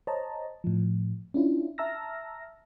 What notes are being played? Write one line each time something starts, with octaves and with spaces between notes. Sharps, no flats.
C5 C#5 D#5 A5 A#5
A2 F3
C#4 D4 E4 F4
E5 A5 A#5 E6 F6 A#6